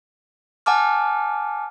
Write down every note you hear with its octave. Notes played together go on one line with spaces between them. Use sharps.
F#5 G#5 A5 D6 F6